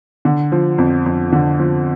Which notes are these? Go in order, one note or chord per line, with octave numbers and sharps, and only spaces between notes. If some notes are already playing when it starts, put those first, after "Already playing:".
D3
F3
F2
F2
D3
F3